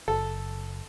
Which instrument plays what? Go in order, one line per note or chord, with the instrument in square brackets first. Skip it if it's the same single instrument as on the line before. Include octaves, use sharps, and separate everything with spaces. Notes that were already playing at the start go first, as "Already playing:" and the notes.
[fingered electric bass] F#1 [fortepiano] A4